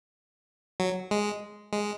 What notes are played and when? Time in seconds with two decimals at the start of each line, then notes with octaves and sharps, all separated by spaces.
0.80 F#3
1.11 G#3
1.73 G#3